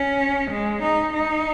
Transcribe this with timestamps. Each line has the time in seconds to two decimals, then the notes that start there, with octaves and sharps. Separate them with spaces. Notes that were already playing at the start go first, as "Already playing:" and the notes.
Already playing: C#4
0.51 G#3
0.82 D#4
1.13 D#4